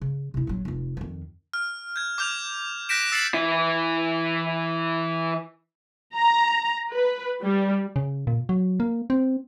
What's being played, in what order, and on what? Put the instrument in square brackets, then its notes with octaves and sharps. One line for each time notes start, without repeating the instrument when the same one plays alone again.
[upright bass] C#3
C3 E4
A#1 F#3
F1 F4
F2 D#3
[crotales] F6
G6 G#6
D6 F6 G6 F7
F#6 G6 A#6 B6 D7 E7
E6 A6 C7 C#7 E7 F#7
[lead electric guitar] E3 E4
[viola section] A#5
B4
G3
[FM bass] C#3
A#2
F#3
A#3
C4